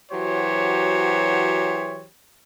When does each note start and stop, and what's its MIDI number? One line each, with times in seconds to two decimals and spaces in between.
0.11 2.06 52
0.11 2.06 54
0.11 2.06 66
0.11 2.06 67
0.11 2.06 72
0.11 2.06 73